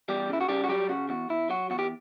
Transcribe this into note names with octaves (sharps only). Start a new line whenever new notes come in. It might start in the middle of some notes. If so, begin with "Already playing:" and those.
E2 G3 G4
C#3 E4
F#4
C#3 G3 G4
F#4
F#3 G3 G4
C#3 F#4
E2 F#4
E2 E4
F#3 F#4
E2 F#4
G4